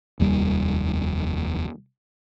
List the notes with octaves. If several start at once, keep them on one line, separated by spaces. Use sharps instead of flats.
F1 D#2 G3